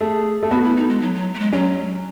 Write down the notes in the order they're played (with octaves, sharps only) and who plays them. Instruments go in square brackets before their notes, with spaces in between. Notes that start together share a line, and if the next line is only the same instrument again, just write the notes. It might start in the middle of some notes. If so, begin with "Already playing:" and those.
[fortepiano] A3 [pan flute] G#4
[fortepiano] A3
[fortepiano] B3 [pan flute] F#4
[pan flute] E4
D#4
G#3
F#3
F#3
A3
G#3
[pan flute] F#3 [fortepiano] C#4